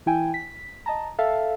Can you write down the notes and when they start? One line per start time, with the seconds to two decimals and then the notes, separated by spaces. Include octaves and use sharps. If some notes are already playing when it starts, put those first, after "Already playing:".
0.06 E3 E4 G5 G#5
0.34 B6
0.86 D#5 A5 A#5
1.19 A4 E5 F5 A5